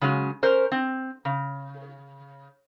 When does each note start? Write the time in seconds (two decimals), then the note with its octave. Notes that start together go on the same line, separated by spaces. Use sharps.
0.01 C#3 F#3 G#3 C#4
0.43 C#4 A#4 C5
0.72 C4
1.25 C#3